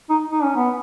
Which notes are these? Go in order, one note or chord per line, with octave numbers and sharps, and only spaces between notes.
D#4
D#4
C#4
B3